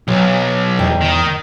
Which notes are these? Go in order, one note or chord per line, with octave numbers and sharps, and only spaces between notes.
B1 F#3
E2 G#2 G5
D#3